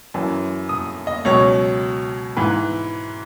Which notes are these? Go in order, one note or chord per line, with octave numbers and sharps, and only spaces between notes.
F#2 E3
D#6
D#5
C#2 B2 F#3 C#5
G#2 E3 B4